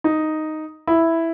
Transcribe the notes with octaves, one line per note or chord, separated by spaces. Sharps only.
D#4
E4